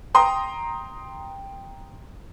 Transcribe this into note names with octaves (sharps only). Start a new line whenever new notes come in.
G5 A#5 C6 D#6